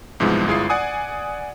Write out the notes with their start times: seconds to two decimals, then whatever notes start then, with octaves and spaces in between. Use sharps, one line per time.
0.20 C2 G#2 E3 F3 G#3 B3
0.48 G1 G#3 E4 F4 D#6 C7
0.70 D5 F#5 G#5 D#6